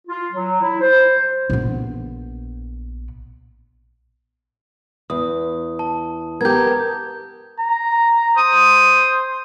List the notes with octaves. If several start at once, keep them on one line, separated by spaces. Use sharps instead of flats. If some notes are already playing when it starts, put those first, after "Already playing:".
F4
F#3
E4
C5
A#1 B3
E2 D#6
A5
B3 G4 A#4 G6 G#6
A#5
C5 D#6